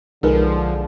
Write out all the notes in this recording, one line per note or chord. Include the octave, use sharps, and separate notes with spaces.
B1 D3 F3 G#3 D#4 G#4 A#4 B4